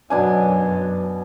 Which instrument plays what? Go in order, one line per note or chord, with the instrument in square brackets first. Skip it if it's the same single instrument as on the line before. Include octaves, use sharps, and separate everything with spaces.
[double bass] F#2 F#3 [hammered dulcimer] B2 D4 G#5